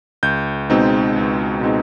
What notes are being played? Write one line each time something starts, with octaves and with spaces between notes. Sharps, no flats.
C#2 G6
B2 G#3 C4 D#4
C#2
B2 G#3 C4 D#4